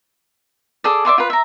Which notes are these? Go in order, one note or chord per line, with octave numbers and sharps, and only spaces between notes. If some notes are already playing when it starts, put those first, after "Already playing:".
G#4 A4 D5
D5 E5 C6 D6
F4 B4
E5 A#5